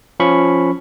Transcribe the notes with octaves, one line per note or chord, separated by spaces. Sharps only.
F3 C#4 B5 C#6